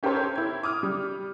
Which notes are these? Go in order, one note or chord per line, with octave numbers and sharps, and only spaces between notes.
C#4 G4 A4 A#4 C5 C#5
E4 G#6
D6 D#6 F6
G3